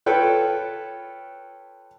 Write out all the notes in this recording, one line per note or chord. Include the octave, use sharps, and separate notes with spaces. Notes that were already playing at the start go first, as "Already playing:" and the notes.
F4 A4 B4 C#5 G5